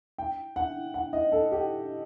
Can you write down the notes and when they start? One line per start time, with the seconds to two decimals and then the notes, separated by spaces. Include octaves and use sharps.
0.18 G5
0.56 F#5
0.94 F#5
1.13 D#5
1.32 A4
1.52 G4